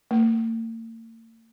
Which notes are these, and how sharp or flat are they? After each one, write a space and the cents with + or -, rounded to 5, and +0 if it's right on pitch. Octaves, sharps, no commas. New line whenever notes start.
A#3 -45